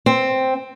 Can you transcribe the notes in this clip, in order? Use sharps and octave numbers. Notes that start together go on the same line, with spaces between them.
C4